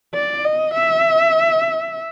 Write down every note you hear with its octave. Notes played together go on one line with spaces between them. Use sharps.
D5
D#5
E5